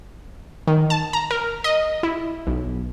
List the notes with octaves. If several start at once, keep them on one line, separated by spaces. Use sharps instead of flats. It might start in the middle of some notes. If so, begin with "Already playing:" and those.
D#3
A5
A#5
A#4
D#5
E4
B1